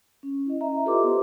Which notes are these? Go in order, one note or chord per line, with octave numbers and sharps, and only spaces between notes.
C#4
E4 D#5
D#5 E5 A#5
F4 G4 A4 B4 C6 D6
B3 C5